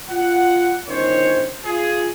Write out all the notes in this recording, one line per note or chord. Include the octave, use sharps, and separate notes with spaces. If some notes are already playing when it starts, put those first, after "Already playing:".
F4 F#5
G1 D#3 C#4 C5 C#5
F4 G#4